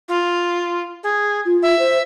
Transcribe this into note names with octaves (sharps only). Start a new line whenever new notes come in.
F4
G#4
F4
E5
C5